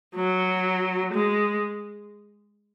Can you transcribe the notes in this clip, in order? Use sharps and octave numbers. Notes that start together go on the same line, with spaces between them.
F#3
G#3